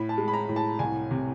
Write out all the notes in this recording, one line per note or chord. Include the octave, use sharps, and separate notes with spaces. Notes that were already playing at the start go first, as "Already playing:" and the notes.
Already playing: A2 B5
A5
G#3
B5
A#5
A2
A5
C2 G#5
C3